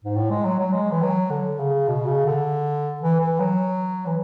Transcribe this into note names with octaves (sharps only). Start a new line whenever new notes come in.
G#2
A2
G#3
F#3
F#3
G#3
E3
F#3
D3
C#3
B2
C#3
D3
E3
E3
F#3
E3